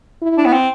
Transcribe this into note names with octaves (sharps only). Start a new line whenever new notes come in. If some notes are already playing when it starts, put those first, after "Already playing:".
E4
D4
B3
C4